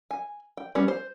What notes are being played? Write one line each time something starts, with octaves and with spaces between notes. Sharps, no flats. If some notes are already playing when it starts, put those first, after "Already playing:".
G#5
G5
G3 B3 C#4
C5